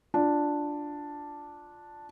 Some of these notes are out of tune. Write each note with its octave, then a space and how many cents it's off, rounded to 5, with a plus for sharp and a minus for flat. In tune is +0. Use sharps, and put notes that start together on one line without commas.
D4 +0 F4 +0